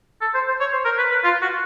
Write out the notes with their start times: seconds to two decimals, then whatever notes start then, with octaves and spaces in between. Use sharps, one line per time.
0.21 A4
0.35 C5
0.48 C5
0.61 C#5
0.73 C5
0.85 A#4
0.99 B4
1.12 B4
1.24 F4
1.42 F#4